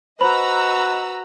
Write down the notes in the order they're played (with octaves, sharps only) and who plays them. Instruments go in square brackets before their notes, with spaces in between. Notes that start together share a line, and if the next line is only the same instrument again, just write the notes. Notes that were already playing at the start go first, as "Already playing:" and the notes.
[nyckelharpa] F#4 B4 [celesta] C5 B5 F#7 [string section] D#5 A#5 E6